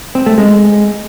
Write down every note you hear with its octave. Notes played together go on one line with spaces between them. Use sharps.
C4
A3
G#3